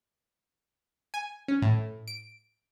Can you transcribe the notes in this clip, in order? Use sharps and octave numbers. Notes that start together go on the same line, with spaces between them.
G#5
C#4
A2
D7